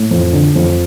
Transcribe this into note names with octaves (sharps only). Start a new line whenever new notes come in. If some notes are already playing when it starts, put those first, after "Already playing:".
Already playing: A2
F2
D3
F2